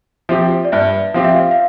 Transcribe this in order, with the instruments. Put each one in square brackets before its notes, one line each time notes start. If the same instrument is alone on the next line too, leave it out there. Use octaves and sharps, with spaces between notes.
[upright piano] F3 C4 G4 [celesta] E5
[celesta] D5
[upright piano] G2 [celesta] E5
[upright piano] F3 C4 G4 [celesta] F5
[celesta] E5
F5
F5